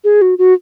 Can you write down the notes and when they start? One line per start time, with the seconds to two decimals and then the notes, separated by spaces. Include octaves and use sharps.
0.04 G#4
0.22 F#4
0.38 F#4